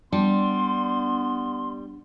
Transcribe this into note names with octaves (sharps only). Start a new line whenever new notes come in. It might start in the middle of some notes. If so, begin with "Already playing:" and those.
G3 B3 D4 C6